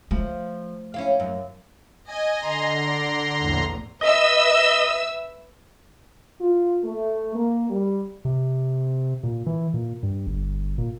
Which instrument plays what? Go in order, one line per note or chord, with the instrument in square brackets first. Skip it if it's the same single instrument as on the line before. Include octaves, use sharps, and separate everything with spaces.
[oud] F3 [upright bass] A3
[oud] C#4 E4 F5
F#2
[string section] D#5 G#5
[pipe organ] D3 A#5 C6
[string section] D5
A#1 E2 A2
[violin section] B4 E5 E6 [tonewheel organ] D#5
[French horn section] F4
A3
A#3
G3
[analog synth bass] C3
A#2
E3
A#2
G2
G1
A#2